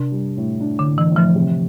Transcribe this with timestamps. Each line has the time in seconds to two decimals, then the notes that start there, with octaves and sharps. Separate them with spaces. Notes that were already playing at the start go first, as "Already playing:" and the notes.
Already playing: C3 D4
0.12 G3
0.37 A2
0.60 D4
0.79 D3
0.86 A2
0.98 E3
1.10 A2
1.16 F3
1.35 C3